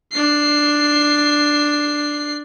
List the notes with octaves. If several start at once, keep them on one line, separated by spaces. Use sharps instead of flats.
D4 C7